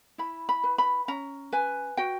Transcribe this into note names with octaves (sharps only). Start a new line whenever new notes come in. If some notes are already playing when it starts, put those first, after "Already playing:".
E4 B5
B5
B4
B5
C#4 A#5
B4 G#5
F#4 G5